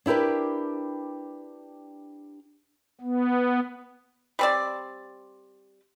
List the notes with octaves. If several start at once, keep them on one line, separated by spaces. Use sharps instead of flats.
D4 E4 G4 A#4 B4
B3
G3 C4 D5